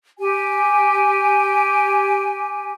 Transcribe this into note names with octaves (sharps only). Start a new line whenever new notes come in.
G4 G#5